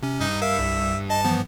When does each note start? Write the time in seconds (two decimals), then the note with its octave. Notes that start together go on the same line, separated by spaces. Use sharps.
0.03 C3 C#4
0.21 G2 D#4
0.42 A#4 E5 F5
0.59 C2
1.10 D#5 A5
1.25 E3 F3 B3